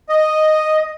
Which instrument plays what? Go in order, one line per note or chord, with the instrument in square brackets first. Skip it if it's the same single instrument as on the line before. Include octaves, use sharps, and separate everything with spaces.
[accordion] D#5